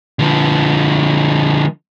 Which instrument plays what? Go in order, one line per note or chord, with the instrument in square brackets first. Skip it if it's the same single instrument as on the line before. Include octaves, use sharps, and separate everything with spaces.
[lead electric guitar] D3 F3